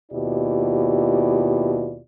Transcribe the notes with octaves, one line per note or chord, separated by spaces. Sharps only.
D#2 B2 E4 F4 G4 D5